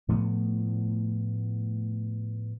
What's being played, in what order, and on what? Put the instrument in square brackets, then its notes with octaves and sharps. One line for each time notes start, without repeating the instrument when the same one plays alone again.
[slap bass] A2 F3 A3 B3